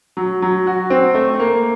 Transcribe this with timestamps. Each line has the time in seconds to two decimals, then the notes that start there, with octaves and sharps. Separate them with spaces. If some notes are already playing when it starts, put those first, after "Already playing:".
0.17 F#3
0.42 F#3
0.67 F#4
0.90 C4
1.15 A3
1.40 A#3